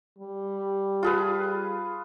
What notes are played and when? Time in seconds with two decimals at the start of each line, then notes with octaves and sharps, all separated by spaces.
0.19 G3
1.03 F4 G#4 B4